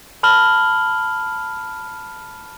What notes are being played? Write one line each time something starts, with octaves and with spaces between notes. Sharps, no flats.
A5 B5 F6 F#7 G7